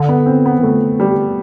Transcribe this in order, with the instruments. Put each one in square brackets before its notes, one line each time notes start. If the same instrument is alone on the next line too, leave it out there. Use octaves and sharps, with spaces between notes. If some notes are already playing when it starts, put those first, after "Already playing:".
Already playing: [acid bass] D3
[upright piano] B3
C4
B3
[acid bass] E3
[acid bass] D3 [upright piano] A3
[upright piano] G3